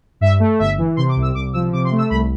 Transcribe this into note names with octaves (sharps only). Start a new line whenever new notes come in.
G2 E5
A3
G1 E5
E3
C3 C6
D6
C2
E6
C2 D6
F3 E6
C3 D6
C6
A3
E6
C2 B5